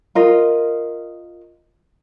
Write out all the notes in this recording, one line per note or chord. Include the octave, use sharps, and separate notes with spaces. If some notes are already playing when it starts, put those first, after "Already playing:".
F4 A#4 D#5